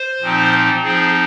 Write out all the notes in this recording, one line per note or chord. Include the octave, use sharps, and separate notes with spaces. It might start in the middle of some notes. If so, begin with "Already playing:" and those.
Already playing: C5
A#2 F3 C4 D#4
F3 C4 D#4 G#4